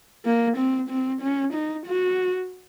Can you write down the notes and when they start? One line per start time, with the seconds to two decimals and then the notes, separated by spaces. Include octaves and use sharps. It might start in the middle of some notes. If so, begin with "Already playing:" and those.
0.25 A#3
0.57 C4
0.89 C4
1.21 C#4
1.53 D#4
1.86 F#4